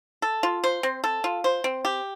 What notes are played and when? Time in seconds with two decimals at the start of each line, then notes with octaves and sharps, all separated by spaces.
0.22 A4
0.43 F4
0.64 C5
0.83 C4
1.04 A4
1.24 F4
1.44 C5
1.64 C4
1.85 G4